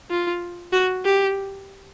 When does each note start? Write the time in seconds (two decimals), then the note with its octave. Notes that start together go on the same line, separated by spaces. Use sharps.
0.10 F4
0.73 F#4
1.05 G4